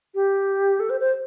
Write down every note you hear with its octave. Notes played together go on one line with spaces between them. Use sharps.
G4
A4
C5
C5